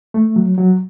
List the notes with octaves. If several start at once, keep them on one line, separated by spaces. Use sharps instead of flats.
A3
F#3
F#3